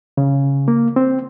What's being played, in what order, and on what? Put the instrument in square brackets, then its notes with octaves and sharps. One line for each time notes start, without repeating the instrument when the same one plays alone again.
[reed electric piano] C#3
A#3
C4